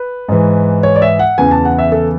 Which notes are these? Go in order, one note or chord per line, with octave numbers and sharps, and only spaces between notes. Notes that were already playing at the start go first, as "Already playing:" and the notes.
Already playing: B4
G#2 E3
C#5
D5
E5
F#5
E2 C#3 E3 G#5
A5
F#5
E5
A4